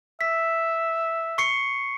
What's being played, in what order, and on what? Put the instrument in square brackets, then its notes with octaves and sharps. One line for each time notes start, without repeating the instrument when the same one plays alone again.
[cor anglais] E5 [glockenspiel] B6
[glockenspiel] C#6 C7 C#7